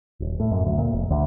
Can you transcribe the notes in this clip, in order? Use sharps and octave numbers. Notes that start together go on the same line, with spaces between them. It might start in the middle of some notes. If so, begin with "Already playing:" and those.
D#1
A2
F#2
D2
A#2
F1
D2